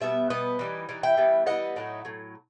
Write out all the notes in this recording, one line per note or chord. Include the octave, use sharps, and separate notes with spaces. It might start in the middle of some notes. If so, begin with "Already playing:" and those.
B2 G3 B3 E5
B2 G3 B3 B4 D#5
E3 G3 D#4
E3 G3 D#4
E5 G5
E3 G3 B3
E3 G3 B3 D#5 F#5
A2 F#3 A3 D#4
A2 F#3